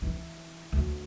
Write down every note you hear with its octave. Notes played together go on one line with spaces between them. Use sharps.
E3
D2